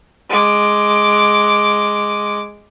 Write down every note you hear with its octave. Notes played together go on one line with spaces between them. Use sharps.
G#3 D6